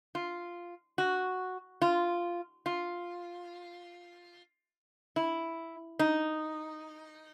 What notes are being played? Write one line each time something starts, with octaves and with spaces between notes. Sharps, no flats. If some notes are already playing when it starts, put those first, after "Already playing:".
F4
F#4
F4
F4
E4
D#4